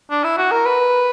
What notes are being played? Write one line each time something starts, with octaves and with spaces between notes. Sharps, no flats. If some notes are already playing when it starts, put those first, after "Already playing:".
D4
E4
F#4
A#4
B4